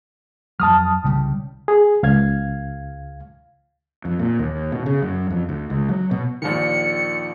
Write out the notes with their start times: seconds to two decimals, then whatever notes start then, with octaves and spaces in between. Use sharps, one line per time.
0.60 F2 F#3 A5 D#6 F6
1.04 C2 C#3 G3
1.68 G#4
2.03 C#2 F5 G#6
4.05 F2
4.19 A#2
4.39 D#2
4.72 B2
4.86 C#3
5.02 F#2
5.30 F2
5.49 D2
5.70 C#2
5.89 F#3
6.11 B2
6.42 A#1 D#2 D#3 C#7